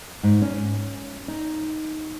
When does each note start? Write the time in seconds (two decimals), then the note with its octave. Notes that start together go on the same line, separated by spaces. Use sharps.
0.23 G#2
0.42 C#4
1.28 D#4